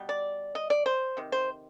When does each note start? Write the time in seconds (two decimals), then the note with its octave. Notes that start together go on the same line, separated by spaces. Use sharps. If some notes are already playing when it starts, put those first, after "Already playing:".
Already playing: B2 G3
0.09 D5
0.55 D#5
0.70 D5
0.86 C5
1.17 C3 D#3
1.32 C5